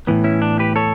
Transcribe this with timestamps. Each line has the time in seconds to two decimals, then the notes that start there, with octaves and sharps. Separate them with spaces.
0.07 A2 E3 B3
0.24 C#4 E4
0.42 D4
0.59 G4 B4
0.76 A4 C#5